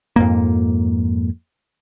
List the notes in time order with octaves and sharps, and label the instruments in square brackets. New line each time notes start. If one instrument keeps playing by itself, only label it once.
[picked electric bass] F2 G#2 A#3